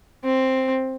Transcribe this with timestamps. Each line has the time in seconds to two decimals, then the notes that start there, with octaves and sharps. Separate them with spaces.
0.24 C4